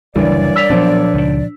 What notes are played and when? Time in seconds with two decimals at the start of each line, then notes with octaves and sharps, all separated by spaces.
0.16 F#1 D2 E3 G3 A#3 D4 C#5 D5
0.56 E6 B6 F7
0.70 A#2 F3 F#3 B3 D4 C5
1.14 C#2 D#3